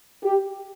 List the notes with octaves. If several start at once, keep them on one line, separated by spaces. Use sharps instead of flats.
G4